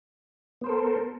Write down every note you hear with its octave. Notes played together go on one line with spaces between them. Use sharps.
B3 A4 A#4 C5